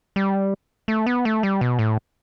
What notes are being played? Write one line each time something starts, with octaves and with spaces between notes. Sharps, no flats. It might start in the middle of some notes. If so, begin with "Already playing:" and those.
G3
A3
B3
A3
G3
B2
A2